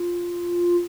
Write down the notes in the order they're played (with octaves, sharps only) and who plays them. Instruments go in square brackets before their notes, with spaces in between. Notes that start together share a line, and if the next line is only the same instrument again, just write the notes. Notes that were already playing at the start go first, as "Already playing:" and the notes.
Already playing: [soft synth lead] F4